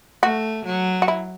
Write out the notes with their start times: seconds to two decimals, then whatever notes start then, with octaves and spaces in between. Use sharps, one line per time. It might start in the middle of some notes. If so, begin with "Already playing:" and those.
0.23 A3 F#4
0.66 F#3
1.02 F#4
1.08 E4